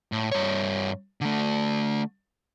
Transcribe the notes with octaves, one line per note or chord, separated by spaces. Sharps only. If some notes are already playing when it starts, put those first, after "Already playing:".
A2
G2 C#5
D3 A3